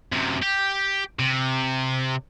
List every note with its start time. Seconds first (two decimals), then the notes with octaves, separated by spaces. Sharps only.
0.12 F#2 C3
0.42 G4
1.19 C3